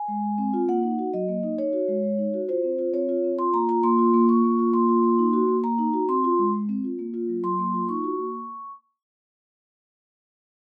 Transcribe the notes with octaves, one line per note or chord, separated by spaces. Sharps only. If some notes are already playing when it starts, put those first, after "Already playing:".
Already playing: G#5
G#3
G#3
C4
F4
A#3 F#5
D#4
F#4
F#3 D#5
A#3
D#4
D#4 C#5
F#4
G#3
G#3
D#4
F#4
F4 C5
C4
F4
C4 C#5
F4
C4
F4 C6
A#3 A#5
F4 A#5
A#3 C6
F4
A#3
F4 C#6
A#3
F4
A#3 C6
F4
A#3
D#4
F#4
A#3
A#3 A#5
D#4
F#4
C4 C6
F4
G#3
G#3
C4
F4
A#3
F4
F#3
F#3 C6
A#3
F4
D#4 C#6
F#4
A#3